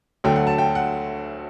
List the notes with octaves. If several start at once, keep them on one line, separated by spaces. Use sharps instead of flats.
D2 D3 F#3 A3 G5
F#5
A5
G5
F#5